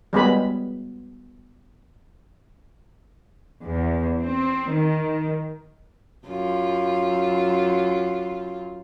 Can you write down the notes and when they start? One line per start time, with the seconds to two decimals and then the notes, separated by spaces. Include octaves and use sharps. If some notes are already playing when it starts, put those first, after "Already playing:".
0.13 G3 G#3 B3 B5
3.64 E2
4.21 C4
4.72 D#3
6.27 F#2 F4